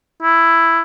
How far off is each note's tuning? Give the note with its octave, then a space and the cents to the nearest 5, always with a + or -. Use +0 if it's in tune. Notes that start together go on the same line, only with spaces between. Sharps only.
E4 +5